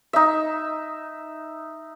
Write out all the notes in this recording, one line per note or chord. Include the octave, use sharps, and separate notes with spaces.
D#4 E5